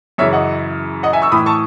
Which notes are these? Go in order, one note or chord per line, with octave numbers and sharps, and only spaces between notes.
F#2 C#3 E3 C#5 E5
D#5 F#5
D#5 F#5
E5 G#5
C#6 E6
A2 E3 B5 D#6
A5 C#6